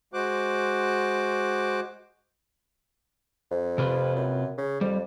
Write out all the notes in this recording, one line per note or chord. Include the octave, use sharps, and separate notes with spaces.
G#3 F#4 C5 D6 F#6
F2
C3 F4 B4
F#2
C#3
F2 G3